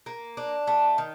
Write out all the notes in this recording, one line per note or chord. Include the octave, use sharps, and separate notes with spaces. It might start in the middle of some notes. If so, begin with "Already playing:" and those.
A#3
D4
A3
D#3